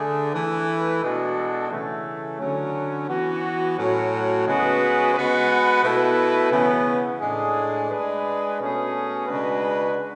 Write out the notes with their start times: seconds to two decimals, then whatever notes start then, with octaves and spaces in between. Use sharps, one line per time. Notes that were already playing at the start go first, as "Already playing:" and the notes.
Already playing: D3 A3 D4 G#4
0.32 E3 A3 E4 B4
1.01 B2 G#3 D4 F#4 A4
1.70 C#3 E3 A3
2.40 D3 F#3 C#4
3.08 E3 B3 F#4
3.77 A2 F#3 C#4 F#4
4.46 C#3 G#3 B3 F#4 B4
5.14 G#3 B3 F#4 B4
5.83 B2 A3 E4 B4
6.52 C#3 E3 B3
7.21 A2 G#3 D4 G#4
7.89 G#3 D4 G#4 B4
8.59 B2 A3 C#4 G#4
9.27 C#3 G#3 D4 F#4 B4